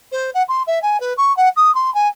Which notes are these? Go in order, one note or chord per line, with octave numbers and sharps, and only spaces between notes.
C5
F#5
C6
E5
G#5
B4
C#6
F#5
D#6
C6
G#5